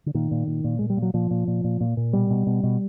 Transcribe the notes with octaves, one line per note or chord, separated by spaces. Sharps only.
D3
A#2 D#3
A#2
A#2
A#2
A#2 G#3
G3
A#2
F#3
A#2 F3
A#2
A#2
A#2
A#2
A#2
B2 G3
B2
B2
B2